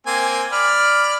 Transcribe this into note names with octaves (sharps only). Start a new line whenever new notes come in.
A#3 C4 G#5
D5 B5 F6